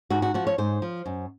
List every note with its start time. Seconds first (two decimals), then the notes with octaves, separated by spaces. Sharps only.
0.10 G#2 F#4
0.22 F#4
0.34 F3 F#4
0.47 C#5
0.58 G#2 C5
0.82 F3
1.06 F#2